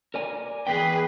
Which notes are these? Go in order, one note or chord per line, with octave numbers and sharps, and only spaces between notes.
A#4 D5 G#5
E2 G#4 B4 G5